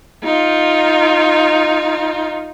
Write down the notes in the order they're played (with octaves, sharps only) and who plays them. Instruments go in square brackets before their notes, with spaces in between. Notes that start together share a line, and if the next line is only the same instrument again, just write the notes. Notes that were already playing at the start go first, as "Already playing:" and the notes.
[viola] D#4 F4